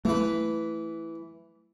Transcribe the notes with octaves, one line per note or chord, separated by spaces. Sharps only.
E3 A3 B4